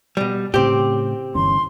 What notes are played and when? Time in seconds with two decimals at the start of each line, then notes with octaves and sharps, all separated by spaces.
0.17 B2 G3
0.54 A2 C#3 C4 G4
1.35 G1 E3 C#4 C6